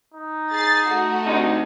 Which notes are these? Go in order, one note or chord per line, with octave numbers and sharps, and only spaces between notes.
D#4
G#4 A6 C7
A3 F#4
D2 C3 D#4